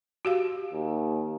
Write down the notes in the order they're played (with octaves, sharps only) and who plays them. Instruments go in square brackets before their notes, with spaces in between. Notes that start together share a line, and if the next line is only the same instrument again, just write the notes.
[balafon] F#4 G4 F5
[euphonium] D#2